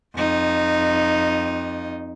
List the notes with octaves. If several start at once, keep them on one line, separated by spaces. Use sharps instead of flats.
F2 D#4